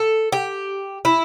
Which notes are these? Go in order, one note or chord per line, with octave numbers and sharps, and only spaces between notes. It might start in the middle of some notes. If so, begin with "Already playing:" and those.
Already playing: A4
G4
E4